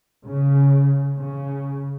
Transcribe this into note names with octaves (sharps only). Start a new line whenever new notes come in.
C#3
C#3